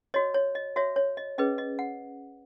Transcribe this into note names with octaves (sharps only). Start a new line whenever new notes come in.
F#4 C#5 D#5
C#5
D#5
F#4 C#5 E5
C#5
D#5
C#4 G#4 B4 D#5
D#5
F#5